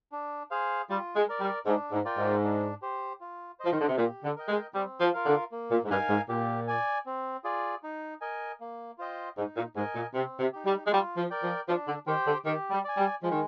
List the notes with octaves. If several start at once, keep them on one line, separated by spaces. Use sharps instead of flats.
D4
G#4 C5 F5
G3 F4
G#3
A#4 D5
G3
G#2 D4
G#2
F4 A#4 D5 G5
G#2
D4
G4 C5
F4
F3 C5 D#5
D#3
D3
C3
A#2 G4
D3
A#4 D#5 G5
G#3
G3 C4
F3
F4 A#4 F5
D3
A#3
A#2
G#2
G2 D#4 A#4 F5 G#5
G#2
A#2 G4
D5 G#5
C4
F4 G#4 D5
D#4
A#4 D#5 G#5
A#3
F4 C5 D#5 G5
G#2 D#4
A#2
G#2 A#4 D#5 G#5
A#2
C3 C4
C3
D#4 G4
G3
G#3
G3 F4
F3
A#4 D5 G5
F3
F3 D4
D3
D#3 G4 C5 G5
D3
D#3 G4
G3
D5 G#5
G3
F3 G#3
D#3